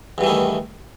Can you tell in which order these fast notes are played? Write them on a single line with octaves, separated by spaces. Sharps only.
E2 G2 E3 A3 D#3